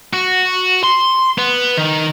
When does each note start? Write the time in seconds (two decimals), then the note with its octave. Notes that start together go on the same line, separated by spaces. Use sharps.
0.13 F#4
0.84 C6
1.38 B3
1.77 D#3